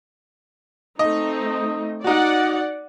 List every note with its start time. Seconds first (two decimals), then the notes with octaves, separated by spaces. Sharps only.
0.99 A3 C4 D#4 D#5
2.04 D#4 F#4 D5 F#5